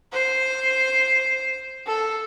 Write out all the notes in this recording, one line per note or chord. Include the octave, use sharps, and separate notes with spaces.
C5
A4